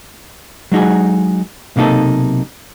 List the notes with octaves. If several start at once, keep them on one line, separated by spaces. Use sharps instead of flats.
F#3 G#3 D#4 F#4 G#4
B1 C3 A#3 D#4 A4